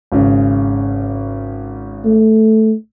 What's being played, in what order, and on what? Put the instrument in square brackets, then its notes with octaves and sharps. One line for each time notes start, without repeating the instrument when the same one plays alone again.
[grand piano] G#1 C#3
[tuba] A3